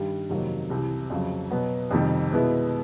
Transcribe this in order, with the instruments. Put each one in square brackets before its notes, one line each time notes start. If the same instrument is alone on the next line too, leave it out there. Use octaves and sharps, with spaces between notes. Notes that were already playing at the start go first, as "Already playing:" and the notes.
Already playing: [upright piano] G2 D#3 G3
F2 C3 D#3 F#3 A#3
C2 C3 E3
F2 C#3 F#3
B2 F#3 B3
F2 C3 D#3 G3
B2 G#3 B3 E4